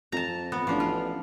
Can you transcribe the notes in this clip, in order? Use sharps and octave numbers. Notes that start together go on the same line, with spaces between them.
F2 A5 A#5
B3
A1 F3 D4
F4